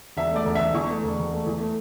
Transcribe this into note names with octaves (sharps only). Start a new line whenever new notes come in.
E1 E5
A3 D5
E1
E5
E1
E2 C#6
A3
E1
E1
A3
E2
A3